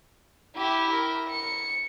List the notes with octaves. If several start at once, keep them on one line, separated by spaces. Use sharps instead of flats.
E4 G4
A#4
C#7